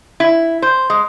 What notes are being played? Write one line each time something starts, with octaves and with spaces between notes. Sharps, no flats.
E4
C5
G#3